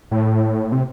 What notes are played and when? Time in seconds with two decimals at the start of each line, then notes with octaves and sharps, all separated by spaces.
0.11 A2
0.72 C3